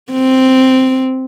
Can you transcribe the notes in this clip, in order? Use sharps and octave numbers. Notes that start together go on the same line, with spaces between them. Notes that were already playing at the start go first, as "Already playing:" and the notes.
C4